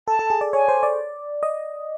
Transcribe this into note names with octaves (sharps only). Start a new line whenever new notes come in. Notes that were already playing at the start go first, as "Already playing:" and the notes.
A4 A5
A4
G#4
D5
C#5 G#5
C5
D5
D#5